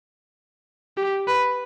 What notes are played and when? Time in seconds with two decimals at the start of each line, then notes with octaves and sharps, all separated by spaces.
0.97 G4
1.28 B4